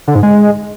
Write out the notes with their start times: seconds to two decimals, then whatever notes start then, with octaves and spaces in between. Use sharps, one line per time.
0.08 D3
0.15 G#2
0.23 G#3